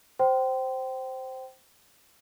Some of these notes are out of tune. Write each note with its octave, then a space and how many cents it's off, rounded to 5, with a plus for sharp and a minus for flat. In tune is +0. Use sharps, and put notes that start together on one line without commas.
C5 +0 G5 -25 C6 -20